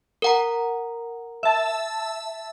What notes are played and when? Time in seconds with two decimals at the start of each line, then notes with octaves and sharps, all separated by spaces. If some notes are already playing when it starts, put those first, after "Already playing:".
0.22 A#4 F#5 A#5
1.43 E5 A5